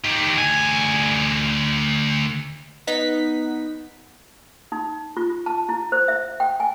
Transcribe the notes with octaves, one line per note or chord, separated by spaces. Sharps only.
D#4 G4
D2 G#5
B3 D#4 F#5 B6
D#4
F4
A5
E4
C5
E5
G5
G#5